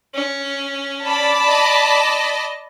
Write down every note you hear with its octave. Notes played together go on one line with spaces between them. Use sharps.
C#4
D5 A5 B5
D#5